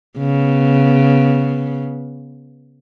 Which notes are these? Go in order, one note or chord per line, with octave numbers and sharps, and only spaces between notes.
C#3 B3